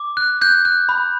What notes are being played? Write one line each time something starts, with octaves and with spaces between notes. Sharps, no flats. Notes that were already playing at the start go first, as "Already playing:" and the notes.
Already playing: D6
F#6
F#6 G6
F#6
B5